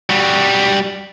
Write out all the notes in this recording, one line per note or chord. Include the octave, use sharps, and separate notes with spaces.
G3 F#4